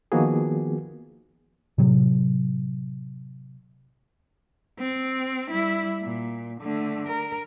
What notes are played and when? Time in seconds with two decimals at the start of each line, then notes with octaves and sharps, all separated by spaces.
0.12 D#3 F3 A#3 B3 F#4 G#4
1.78 A2 C3 F#3
4.79 C4
5.49 G3 E4
6.02 A#2
6.61 D3 A3
7.07 A#4